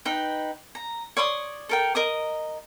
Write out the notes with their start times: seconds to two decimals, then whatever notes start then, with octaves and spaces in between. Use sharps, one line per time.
0.05 D#4 B4 G5
0.75 A#5
1.17 C#5 D5 C6 D#6
1.69 A4 A#4 G5
1.95 A#4 D#5 D#6